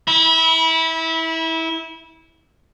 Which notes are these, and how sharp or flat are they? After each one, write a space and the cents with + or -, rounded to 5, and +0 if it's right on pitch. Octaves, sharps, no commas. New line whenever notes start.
E4 -20 B5 -30